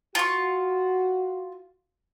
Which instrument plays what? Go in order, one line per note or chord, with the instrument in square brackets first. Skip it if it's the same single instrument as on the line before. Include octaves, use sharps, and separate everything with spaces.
[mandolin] F4 C#6 [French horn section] F#4